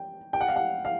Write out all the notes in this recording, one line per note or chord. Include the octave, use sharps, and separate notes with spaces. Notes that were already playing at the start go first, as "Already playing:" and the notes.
Already playing: G5
G5
F#5
F5
F#5
F5